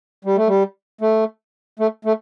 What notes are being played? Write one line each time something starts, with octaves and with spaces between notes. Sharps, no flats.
G3
A3
G3
A3
A3
A3